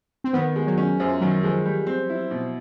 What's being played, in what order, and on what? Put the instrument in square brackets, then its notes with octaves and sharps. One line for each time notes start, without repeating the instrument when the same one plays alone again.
[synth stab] C4
[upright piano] D#3 [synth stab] B3
[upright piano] G#3
[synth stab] F#3
[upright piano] C#4
[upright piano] F#2 [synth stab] F3
[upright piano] D#3 [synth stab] F#3
[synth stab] F3 [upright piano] G#3
[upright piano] G3
C4
E4
B2